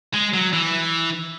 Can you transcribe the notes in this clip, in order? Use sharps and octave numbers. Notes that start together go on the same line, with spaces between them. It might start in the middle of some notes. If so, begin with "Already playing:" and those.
G#3
F#3
E3